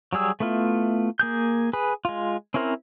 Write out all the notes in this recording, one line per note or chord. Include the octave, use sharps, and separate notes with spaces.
F#3 G3 G#4 E6
A3 B3 E4 F4
A#3 G#4 G6
G#4 B4
G#3 F4
C4 C#4 E4 A#4 C5